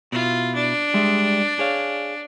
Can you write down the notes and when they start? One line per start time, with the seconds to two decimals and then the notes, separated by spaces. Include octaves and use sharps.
0.12 B2 E4 F4
0.55 D4
0.94 G3 G#3 E5
1.59 G#4 C#5 F5